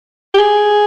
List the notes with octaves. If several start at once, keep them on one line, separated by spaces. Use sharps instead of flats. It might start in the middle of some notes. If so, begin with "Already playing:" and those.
G4
G#4